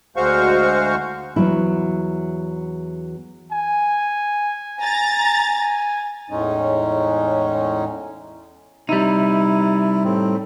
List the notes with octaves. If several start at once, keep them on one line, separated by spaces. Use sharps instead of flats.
D2 G#3 F#4 C5 F5 C#6
E2 F#3 E4
G#5
A#5 A6
G#5
E2 A2 G#3 C#4 D#4
C3 G3 D#4 E4
A2 C4